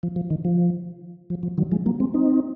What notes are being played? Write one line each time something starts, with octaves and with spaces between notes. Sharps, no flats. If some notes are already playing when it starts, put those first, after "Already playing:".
F3
F3
D#3
F3
F3
F3
D#3 F#3
F3 G#3
F#3 A#3
G#3 C4
C4 D#4